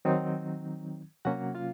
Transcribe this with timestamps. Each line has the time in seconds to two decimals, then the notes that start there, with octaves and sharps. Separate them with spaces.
0.05 D#3 F#3 C4 D#4
1.25 C3 F#3 A#3 C#4 F#4 F#5
1.55 F4 F5